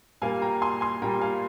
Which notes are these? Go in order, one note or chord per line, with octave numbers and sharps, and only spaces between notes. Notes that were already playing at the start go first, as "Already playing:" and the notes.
A#2 G3 A#3 F5 G#5
G5 A#5
G#5 C6
G#5 C6
A#2 G3 A#3 G5 A#5
F5 G#5